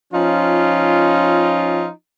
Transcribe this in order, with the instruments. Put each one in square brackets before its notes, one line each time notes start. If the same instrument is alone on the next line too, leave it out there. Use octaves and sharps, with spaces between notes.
[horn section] F3 C#4 D#4 F4